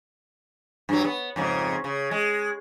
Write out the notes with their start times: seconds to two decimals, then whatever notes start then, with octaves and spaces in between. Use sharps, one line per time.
0.89 G2 F#3
1.05 B3
1.36 F2 G#2 C#3
1.84 C#3
2.11 G#3